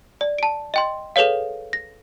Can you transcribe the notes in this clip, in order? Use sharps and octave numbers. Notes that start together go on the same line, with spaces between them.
D5
A5 D7
D#5 G5 C6
G#4 A4 B4 C#5 F5
A#6